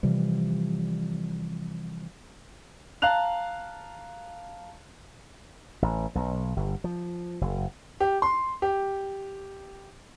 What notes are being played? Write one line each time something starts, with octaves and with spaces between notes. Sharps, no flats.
C3 E3 F3 G3
F5 A5 A#5 F#6 F7
A1
B1
G1
F3
F#1
G4
C6
G4